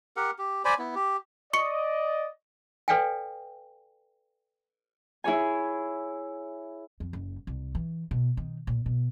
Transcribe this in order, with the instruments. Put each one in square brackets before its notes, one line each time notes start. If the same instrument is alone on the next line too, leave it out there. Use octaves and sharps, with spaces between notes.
[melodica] G4 A#4 F#5
G4
C5 D5 G#5 B5
B3 E4
G4
[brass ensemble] D5 D#5 [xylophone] C#6 C#7
[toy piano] A4 B4 D5 F5 G5 G#5
[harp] E4 G#4 C#5 G#5
[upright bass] F2
F#1
C2
E3
B2
D#3
A#2
B2